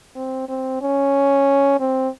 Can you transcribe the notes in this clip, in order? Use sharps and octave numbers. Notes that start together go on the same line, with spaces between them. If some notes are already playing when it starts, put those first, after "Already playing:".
C4
C4
C#4
C4